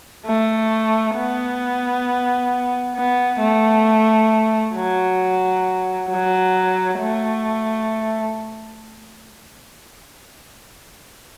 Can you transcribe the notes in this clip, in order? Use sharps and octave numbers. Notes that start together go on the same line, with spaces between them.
A3
B3
B3
A3
F#3
F#3
A3